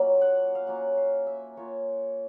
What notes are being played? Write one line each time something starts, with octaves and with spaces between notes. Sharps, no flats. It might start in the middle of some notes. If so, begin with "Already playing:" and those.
Already playing: F#3 A#3 C#4 F4 B5
F#5
F5
F#3 A#3 C#4 F4 F#5
F5
E5
A#3 C#4 F4 C#5